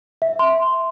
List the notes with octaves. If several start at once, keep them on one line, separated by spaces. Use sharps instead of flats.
E5
C6